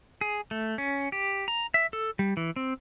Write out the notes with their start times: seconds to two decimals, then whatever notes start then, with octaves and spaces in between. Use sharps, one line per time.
0.21 G#4
0.51 A3
0.78 C#4
1.12 G4
1.48 A#5
1.74 E5
1.93 A4
2.19 G3
2.37 E3
2.56 C4